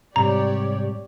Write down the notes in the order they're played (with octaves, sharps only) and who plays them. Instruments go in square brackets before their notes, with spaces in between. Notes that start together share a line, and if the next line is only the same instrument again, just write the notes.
[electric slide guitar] G#2 C3 G3 [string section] G4 C#5 D5 [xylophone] A#5